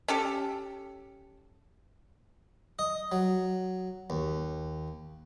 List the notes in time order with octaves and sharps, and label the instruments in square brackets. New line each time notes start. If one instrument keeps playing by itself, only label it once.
[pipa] C#4 G4 A4
[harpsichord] D#5
F#3
D#2